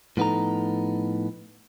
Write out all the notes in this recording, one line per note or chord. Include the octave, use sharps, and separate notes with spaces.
A2 F3 B3 D#4 A4 A#5